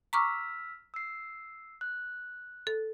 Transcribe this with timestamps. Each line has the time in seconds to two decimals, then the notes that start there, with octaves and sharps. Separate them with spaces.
0.13 A#5 C#6 D6 E6 F6 B6
0.94 E6 C7
1.81 F#6
2.67 A4